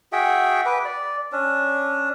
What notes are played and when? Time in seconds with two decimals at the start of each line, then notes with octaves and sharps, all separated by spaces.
0.12 F#4 G#4 E5 G5
0.66 B4 D6
0.85 D5
1.32 C#4 D4